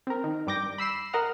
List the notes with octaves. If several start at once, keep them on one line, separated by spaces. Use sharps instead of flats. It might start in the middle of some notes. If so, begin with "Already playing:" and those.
C4 A#4
D#3
G2 G3 D6 G6 A#6
B5 E6 C7 E7
A#4 D#5 F#5 F6